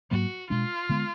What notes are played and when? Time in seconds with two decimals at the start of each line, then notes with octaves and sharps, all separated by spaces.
0.11 G#2 F#3 A#3 F#4
0.50 B2 G#3 D4 F4
0.89 D3 G#3 B3